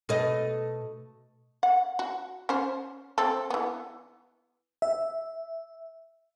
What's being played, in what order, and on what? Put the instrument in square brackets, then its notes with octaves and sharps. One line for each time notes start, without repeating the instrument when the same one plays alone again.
[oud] B2 A3 D#5
[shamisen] F#5
F#4
C#4 C5
C4 A4
E3 B3
[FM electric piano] E5